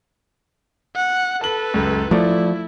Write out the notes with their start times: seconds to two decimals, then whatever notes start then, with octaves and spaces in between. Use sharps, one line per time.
0.96 F#5
1.41 A4 B4 A5 F#7
1.74 C#2 F#2
2.11 F3 A3 E4 D5